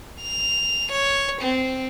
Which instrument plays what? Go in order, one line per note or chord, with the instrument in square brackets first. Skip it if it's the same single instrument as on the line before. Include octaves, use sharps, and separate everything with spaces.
[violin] F7
C#5
C4